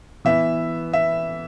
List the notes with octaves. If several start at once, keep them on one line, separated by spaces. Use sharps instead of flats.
E3 B3 E5
E5